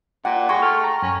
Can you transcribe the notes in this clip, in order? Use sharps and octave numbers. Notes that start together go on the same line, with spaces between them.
A#2 F#5 G5
G#3 C#6
A3 F6
A#5
F#2 C#4